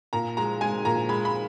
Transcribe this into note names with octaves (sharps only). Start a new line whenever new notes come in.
A#2 A#5
G#3 A#5
G#3 G#5
A#2 A#5
G#3 B5
B5